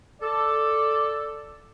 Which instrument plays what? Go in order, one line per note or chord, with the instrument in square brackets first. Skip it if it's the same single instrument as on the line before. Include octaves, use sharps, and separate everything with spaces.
[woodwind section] A4 [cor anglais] D5